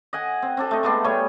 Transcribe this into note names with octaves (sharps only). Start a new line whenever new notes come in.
D#5 F#5 G#5
C4
C4 D4 A4
A3 D#5
G#3 A3 B3 D4
G3 A3 C#5 G#5